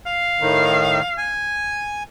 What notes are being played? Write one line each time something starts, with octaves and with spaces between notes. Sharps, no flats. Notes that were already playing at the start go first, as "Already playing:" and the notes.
F5
A2 D#3
G#5